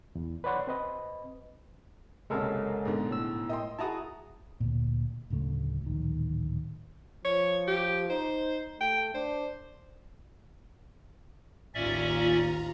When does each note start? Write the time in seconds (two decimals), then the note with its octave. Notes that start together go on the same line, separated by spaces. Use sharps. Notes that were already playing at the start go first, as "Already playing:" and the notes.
0.15 E2
0.44 B4 C#5 D5 F#5 C6 F#6
0.67 C4 B4 D#5
2.30 F#1 C2 G#3 C#4 A4 A#4
2.85 G#2 B2 D3
3.11 A2 E6
3.49 D#5 G5 C6
3.79 E4 F#4 G#4 A5 A#5 D#6
4.60 D2 A#2
5.30 D1 D2 C#3 A3
5.84 D1 A#1 D#3
7.25 F3 C#5
7.67 G4
8.10 D#4 C5
8.80 A3 G5
9.14 D4 C5
11.74 A1 D#2 C#4 F4 D5 E5 A#5